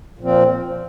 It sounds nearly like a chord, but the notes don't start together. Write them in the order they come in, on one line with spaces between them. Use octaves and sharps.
A#2 F3 C4